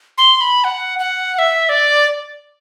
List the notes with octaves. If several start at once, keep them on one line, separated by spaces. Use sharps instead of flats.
C6
B5
F#5
F#5
F#5
E5
D5